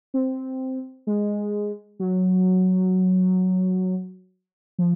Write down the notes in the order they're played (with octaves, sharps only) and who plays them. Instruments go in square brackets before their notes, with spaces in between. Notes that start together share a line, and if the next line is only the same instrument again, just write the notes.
[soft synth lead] C4
G#3
F#3
F3